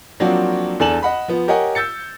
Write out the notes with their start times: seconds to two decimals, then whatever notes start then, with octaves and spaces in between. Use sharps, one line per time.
0.20 F3 F#3 A#3 C4 D4 F#4
0.80 E2 D4 A4 G#5 E7 F#7
1.03 D#5 F#5 B5
1.28 F3 B3
1.48 G4 A#4 C#5 D#5 F#5 G#5
1.75 E6 G6 A6 C#7